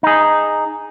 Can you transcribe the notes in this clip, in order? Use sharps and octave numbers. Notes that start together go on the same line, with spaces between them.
D#4 G#4